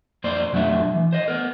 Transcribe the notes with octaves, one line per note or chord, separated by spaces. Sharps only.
F2 A#3 C5 D5
B1 F2 F#3 A3 D4 E5
E3
C5 D#5
B3 A#4